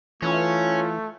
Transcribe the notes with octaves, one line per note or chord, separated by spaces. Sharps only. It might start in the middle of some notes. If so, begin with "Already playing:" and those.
E3 A3 C#4 F4